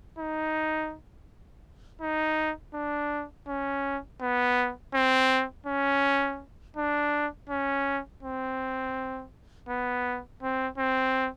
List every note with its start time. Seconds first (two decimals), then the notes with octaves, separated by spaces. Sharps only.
0.18 D#4
2.01 D#4
2.74 D4
3.47 C#4
4.21 B3
4.94 C4
5.66 C#4
6.76 D4
7.49 C#4
8.23 C4
9.69 B3
10.42 C4
10.78 C4